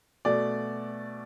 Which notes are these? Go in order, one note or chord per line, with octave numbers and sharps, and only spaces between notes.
B2 A3 D5